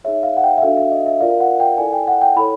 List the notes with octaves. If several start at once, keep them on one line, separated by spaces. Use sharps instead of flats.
D#4 G#4 C#5 E5
F5
F#5
G5
E5
D4 F#4 A4 F5
E5
D#5
E5
F4 A#4 D5 F5
F#5
G5
E4 A4 D5 G#5
G5
F#5
G5
E4 A4 C#5 B5